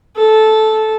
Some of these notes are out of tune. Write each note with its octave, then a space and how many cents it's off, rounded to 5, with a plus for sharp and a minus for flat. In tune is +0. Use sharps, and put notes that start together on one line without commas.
A4 -10